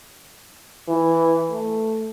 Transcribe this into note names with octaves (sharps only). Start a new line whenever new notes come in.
E3
A3